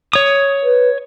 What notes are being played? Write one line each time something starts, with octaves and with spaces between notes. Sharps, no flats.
C#5 D#6
B4